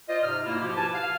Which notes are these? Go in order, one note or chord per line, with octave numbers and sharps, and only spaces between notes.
F4 C5 D5 D#5
G#2 C3 F6
G#2 B2 A#3 E4 F4
B2 F3 F#4 G4
B4 G#5 A5
F5